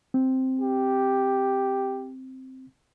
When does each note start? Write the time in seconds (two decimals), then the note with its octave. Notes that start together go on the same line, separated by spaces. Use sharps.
0.14 C4
0.60 G4